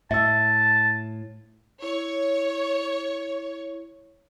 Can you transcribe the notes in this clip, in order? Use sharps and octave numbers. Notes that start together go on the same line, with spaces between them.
A2 E5 A5 E6
E4 C#5